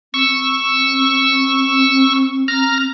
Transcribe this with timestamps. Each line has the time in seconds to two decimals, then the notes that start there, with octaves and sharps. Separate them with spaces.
0.14 C4 C#6 E6
2.48 A#5 F6